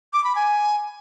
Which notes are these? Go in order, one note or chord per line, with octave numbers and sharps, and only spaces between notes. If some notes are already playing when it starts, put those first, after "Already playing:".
D6
B5
G#5